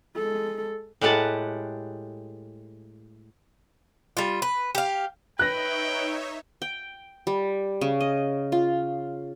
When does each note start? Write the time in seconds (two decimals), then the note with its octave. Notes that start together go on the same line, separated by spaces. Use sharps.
0.15 G#3 A4
1.01 A2 G#3 G4 B4 F#5 A5
4.17 G3 F4
4.42 B4
4.75 G4 F5
5.39 D#4 B4 C#5 E5 G5 F#6 A#6
6.62 G5
7.27 G3
7.81 C#3
8.00 D#5
8.52 F4